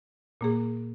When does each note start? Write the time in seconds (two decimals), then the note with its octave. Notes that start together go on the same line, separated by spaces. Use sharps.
0.41 A#2 A#3 G#4